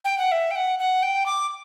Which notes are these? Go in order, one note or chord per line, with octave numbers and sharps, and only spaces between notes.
G5
F#5
E5
G5
F#5
F#5
G5
D6